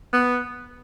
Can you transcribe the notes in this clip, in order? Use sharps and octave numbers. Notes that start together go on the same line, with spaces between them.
B3